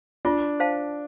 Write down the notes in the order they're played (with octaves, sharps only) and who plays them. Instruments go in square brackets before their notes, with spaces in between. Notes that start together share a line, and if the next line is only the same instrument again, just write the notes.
[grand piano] D4 [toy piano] F4
[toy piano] C5 F5 A5